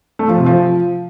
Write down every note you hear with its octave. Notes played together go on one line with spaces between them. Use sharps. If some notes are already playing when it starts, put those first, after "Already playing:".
A3
F3
C3
F3